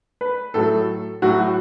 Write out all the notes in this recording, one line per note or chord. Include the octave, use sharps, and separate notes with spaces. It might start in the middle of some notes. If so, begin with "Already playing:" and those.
B4
A2 F#3 A4
A2 F#3 F#4
F#4